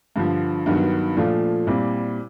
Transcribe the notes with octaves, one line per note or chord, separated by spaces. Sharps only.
G2 D3 F3
G2 D#3 F#3 B3
A#2 F3 A3 D4 F4
A#2 G3 C4 E4